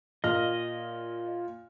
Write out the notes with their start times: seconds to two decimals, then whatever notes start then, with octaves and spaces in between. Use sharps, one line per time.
0.24 A#2 F4 D#5 F6